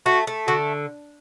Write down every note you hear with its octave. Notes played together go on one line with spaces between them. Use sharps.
A3 F#4
A3
D3 F#4